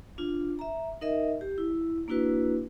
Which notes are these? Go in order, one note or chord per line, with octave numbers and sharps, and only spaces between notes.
D4 F4
E5 A#5
D#4 A#4 D#5 E5
G4
E4
A#3 D4 E4 F#4 B4